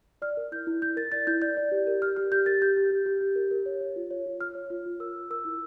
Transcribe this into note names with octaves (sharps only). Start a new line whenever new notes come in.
D5 F6
A#4
E4 G6
E4
E4 G6
A#4 A6
D5 A6
E4 G6
D5 G6
D5
G4
A#4
G4 F6
G4 F6
G4 G6
A#4 A6
G4 G6
G4
G4
G4
G4
A#4
A#4
C#5
C#5
F4
C#5
F4
C#5 F6
C#5
F4
F4
A#4 E6
A#4
A#4 E6
E4